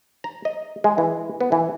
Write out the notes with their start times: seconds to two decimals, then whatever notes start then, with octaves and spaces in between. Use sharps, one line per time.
0.24 A#5
0.45 D#5
0.84 G#3
0.98 E3
1.41 B3
1.52 E3